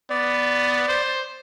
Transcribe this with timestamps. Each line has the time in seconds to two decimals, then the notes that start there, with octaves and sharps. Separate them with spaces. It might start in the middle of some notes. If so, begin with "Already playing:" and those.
0.10 B3 D5
0.88 C5